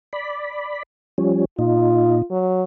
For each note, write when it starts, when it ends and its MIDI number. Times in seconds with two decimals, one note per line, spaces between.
0.13 0.83 74
0.13 0.83 83
1.18 1.45 53
1.18 1.45 55
1.18 1.45 61
1.59 2.22 46
1.59 2.22 63
1.59 2.24 65
2.31 2.64 54